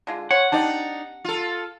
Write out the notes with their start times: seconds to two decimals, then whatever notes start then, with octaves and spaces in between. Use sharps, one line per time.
0.07 D3 G#3 F4
0.31 C5 C#5 F#5
0.52 C4 D4 D#4 G4 D5 A5
1.25 F4 A4